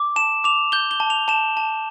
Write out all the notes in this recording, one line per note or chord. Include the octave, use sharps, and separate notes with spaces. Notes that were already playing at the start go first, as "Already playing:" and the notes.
Already playing: D6
A5 E7
D6 F7
G6 G7
G7
A5
F7
A5 E7
A5